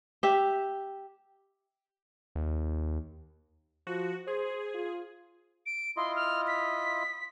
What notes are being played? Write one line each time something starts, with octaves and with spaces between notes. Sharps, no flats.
G4 E5
D#2
F3 F#4
G#4 C5
F4
D7
E4 F4 D#5 C6
F6
B6